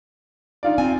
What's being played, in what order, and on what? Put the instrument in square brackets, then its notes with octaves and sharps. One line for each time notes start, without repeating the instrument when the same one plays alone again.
[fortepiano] D#4 F4 D5
[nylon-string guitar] C4 G#5